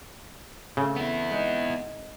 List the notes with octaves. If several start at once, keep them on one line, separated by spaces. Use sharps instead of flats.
C#3 A3 C4
B3 E4
G#3 D#4